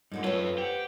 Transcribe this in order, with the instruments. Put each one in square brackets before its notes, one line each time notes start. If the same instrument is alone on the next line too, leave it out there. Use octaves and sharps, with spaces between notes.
[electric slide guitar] G2 G3 D#4 [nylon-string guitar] A#2 D3 G#3
[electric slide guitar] F#2 [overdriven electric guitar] F4 A4 [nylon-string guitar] B4 C#5
[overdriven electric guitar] G4 [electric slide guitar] C5 F#5